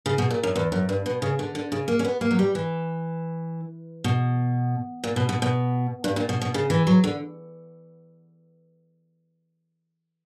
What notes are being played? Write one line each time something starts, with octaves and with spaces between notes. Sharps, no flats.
C#3
B2
A#2
F#2
E2
F#2
G2
B2
C#3
D3
D3
C#3
A#3
C#4
B3
A#3
F#3
G3
E3
B2
A#2
B2
B2
B2
G2
A#2
B2
B2
C#3
E3
F#3
D3